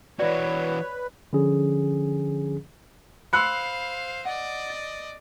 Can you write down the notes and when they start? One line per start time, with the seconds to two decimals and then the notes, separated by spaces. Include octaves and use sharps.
0.19 E3 F#4 B4 C#5 D5 E5
1.33 D3 F3 C#4 G#4
3.33 C5 F5 B5 C6 E6 F#6 C#7
4.25 D5 D#5 F#5
4.70 A6